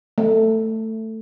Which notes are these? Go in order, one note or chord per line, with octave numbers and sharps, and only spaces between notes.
A3